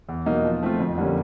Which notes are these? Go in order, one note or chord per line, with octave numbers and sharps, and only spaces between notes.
E2
B2 F#3 A#3 D#4
F3
A3 C4 F4
F2
D3 G3 A#3 C#4